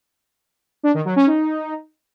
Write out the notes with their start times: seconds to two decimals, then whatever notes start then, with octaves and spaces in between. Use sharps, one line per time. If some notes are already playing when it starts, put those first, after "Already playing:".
0.83 D4
0.94 D#3
1.05 F#3
1.16 C#4
1.27 D#4